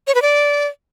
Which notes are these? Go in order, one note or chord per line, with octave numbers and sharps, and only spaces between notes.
C#5
B4
D5